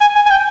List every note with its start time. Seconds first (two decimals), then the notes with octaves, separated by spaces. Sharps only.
0.01 G#5
0.15 G#5
0.26 G#5
0.30 G5